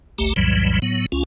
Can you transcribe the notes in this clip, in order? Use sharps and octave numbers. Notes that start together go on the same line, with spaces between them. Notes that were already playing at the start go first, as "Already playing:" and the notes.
G#1 D2 A3 G4 A#5
B1 F2 A2 E3 F#3 G3
A2 F#3 B3
C#2 C#4 F4